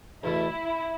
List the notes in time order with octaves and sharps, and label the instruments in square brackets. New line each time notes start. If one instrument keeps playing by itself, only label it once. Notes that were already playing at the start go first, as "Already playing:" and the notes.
[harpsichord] E2 B2 A3 [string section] E4